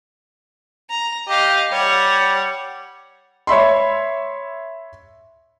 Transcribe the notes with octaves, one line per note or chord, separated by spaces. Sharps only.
A#5
G4 D#5 F5
G3 C#5 F#5
C#5 E5 B5 C6